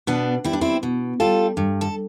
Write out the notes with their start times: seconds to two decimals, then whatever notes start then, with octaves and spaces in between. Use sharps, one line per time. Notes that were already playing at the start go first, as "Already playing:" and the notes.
0.07 B2 B3 D4
0.44 G3 E4
0.53 D4
0.61 C4 E4
0.83 B2
1.20 G3 F4 A4
1.57 G2
1.81 A4